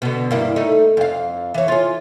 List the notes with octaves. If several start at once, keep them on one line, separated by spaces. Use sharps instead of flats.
B2 D3
G2 A#3 E4
A3 D#4
F2 F5
E3 C#5
F4 G#4